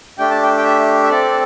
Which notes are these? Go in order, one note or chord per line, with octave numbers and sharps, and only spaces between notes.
A3 D4 G4 G5
A5
G5
G5
E5
E5
C4 A4 D5